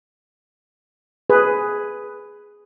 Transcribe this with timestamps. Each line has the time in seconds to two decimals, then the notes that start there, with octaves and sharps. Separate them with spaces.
1.30 G#4 B4